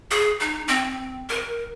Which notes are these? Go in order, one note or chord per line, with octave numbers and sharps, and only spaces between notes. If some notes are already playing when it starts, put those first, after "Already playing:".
G#4
D#4
C4
A#4